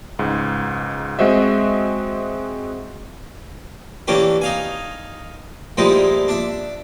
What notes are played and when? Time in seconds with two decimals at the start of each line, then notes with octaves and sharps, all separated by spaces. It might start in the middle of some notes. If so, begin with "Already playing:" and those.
0.19 C#2 G#2
1.19 G#3 C4 F#4 C5 D#5 E5
4.08 E3 A#3 C#4 D4 G4
4.41 D#4 F5 G#5
5.77 A#2 F3 G3 G#3 D#4 E4
6.28 D4 E5